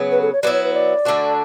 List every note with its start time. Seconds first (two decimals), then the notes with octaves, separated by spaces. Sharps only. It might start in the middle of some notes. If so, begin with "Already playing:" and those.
Already playing: C#3 F#3 B3
0.11 B4
0.21 A4
0.32 C#5
0.42 F#3 B3 E4 D5
0.53 C#5
0.63 B4
0.74 D5
1.05 D3 A3 D4 F#4